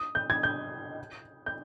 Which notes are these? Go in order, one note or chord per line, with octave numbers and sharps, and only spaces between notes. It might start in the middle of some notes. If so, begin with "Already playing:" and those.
Already playing: D#6
G6
G#6
G6
G6